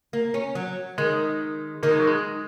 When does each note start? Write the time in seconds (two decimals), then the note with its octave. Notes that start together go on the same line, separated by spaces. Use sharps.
0.13 A#3
0.34 C#4
0.55 F#3
0.98 D#3 G#3
1.83 D#3 A#3
1.91 G#3
1.99 F#3
2.07 G#3